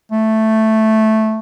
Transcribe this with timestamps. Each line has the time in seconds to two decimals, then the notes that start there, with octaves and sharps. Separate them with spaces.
0.12 A3